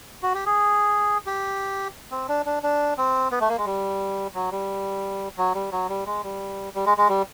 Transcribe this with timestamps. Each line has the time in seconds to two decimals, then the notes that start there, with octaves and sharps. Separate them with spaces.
0.23 F#4
0.34 G4
0.46 G#4
1.26 G4
2.11 C4
2.28 D4
2.46 D4
2.63 D4
2.98 C4
3.31 B3
3.41 A3
3.49 A#3
3.58 G#3
3.66 G3
4.34 F#3
4.51 G3
5.38 F#3
5.55 G3
5.72 F#3
5.89 G3
6.06 G#3
6.23 G3
6.75 G3
6.86 G#3
6.98 G#3
7.09 G3